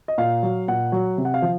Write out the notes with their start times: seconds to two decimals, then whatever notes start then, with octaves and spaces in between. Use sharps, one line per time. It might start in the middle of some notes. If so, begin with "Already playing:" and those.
0.08 D#5
0.18 A#2 F5
0.43 F#3
0.68 A#2 F#5
0.92 F#3
1.18 C3
1.25 F#5
1.34 F5
1.42 F3